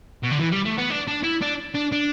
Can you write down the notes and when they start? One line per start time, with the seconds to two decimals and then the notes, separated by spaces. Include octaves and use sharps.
0.23 B2
0.31 D3
0.39 E3
0.52 G3
0.65 A3
0.78 B3
0.90 D4
1.08 D4
1.24 E4
1.42 D4
1.75 D4
1.92 D4